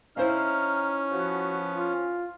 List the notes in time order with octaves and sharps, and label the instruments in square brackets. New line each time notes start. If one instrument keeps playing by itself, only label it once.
[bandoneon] C#4 [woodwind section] D#4 F6 [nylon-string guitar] E4 C5 F5
[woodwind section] F3 B3 [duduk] F#4
[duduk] F4